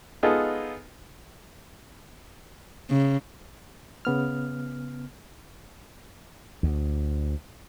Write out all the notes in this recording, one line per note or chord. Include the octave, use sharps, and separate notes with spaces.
G#3 B3 D#4 F4 G#4 A4
C#3
C#3 B3 F6
D2